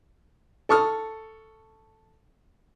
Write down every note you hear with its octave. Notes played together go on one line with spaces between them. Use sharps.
A4 A5 C#6 D#6 F6